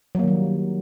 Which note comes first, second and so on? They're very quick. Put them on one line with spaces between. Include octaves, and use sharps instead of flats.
F#3 A#3 D#3 G3